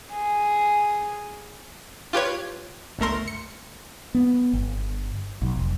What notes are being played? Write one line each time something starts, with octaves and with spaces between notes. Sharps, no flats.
G#4
F4 G4 B4 C#5
G1 C#2 A3 A#4 C6
C#7
B3
G1
B1
F1